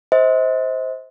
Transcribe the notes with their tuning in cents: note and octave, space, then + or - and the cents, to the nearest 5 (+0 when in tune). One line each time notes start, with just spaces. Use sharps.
C5 +0 D#5 +45